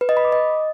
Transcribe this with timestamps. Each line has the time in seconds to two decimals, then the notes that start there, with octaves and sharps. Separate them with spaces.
0.01 B4
0.09 D#5
0.17 B5
0.25 D6
0.32 D#5